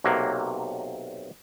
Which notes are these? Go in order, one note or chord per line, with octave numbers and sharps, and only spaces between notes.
B1 C3 F#3 A#3